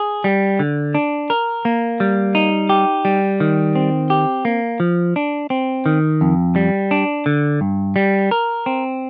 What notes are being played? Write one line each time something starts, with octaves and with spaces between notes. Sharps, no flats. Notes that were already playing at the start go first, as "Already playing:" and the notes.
Already playing: G#4
G3
D3
D4
A#4
A#3
G3
D#4
G4
G3
D#3
C4
G4
A#3
F3
D4
C4
D#3
F2
G3
D4
D3
G2
G3
A#4
C4